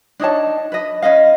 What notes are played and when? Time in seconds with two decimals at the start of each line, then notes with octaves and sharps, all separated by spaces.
0.20 D4 D#4 C#5 A5
0.72 B4 D#5
1.03 C#4 B4 D#5 F5